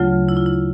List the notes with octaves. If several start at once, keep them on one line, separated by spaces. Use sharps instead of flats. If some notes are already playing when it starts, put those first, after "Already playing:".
Already playing: D2 C#3 F#3 A3 F4
E4
F4
E4